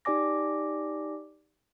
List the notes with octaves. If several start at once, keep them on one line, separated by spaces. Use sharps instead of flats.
D#4 G4 D5 G#5 D6 A#6